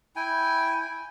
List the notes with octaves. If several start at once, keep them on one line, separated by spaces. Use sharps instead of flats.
E4 G5 G#5